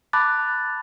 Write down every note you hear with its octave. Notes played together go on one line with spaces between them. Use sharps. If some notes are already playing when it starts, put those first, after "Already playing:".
A5 B5 D6 F#6 A6